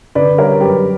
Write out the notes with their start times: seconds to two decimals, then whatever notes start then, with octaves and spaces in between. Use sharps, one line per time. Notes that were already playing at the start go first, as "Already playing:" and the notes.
0.15 D3 B4 D5
0.38 G3 A#4 C#5
0.60 F#2 G4 B4